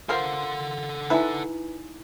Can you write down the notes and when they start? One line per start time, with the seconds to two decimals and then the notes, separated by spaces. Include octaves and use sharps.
0.09 F4 A4 A#4 C5 F#5
1.10 D#4 E4 B4 E5 G#5